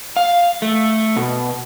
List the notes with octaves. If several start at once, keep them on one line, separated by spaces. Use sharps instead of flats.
F5
A3
B2